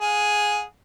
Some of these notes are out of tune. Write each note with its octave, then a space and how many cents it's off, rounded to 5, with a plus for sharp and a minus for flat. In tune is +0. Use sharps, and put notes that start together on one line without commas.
G#4 +0 F#5 -45